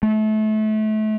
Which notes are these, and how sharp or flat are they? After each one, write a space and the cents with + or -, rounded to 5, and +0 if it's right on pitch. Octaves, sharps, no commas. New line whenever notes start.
A3 -30